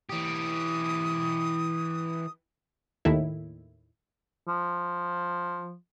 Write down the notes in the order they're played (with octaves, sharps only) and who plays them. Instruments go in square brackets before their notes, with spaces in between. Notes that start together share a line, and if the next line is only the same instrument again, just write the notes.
[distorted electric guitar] E3 G4 [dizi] D#6
[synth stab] D#2 A2 D#3 E4
[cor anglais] F3